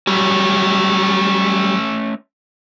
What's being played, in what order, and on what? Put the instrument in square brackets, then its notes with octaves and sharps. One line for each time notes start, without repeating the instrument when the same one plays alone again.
[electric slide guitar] F#3 G3 [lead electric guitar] A3 C#4